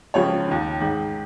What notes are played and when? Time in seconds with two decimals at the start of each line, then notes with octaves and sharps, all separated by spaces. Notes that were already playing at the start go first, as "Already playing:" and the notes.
0.14 C#2 C#3 F3 C#5
0.48 D#2 D#3
0.80 G#2 D#3